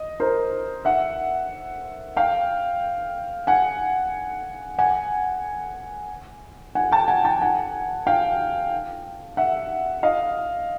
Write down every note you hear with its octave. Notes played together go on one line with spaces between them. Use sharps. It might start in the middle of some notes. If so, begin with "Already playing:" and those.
Already playing: D#5
A#4 C5
E5 F#5
F5 G5
F#5 G#5
F#5 G#5
F#5 G#5
G5 A5
F#5 G#5
G5 A5
F#5 G#5
F5 G5
E5 F#5
D#5 F5